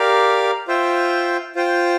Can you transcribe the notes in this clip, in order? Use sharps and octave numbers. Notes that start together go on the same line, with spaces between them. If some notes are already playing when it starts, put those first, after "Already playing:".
Already playing: G4 A#4 D5 F5
F4 C5 E5 G5
F4 C5 G5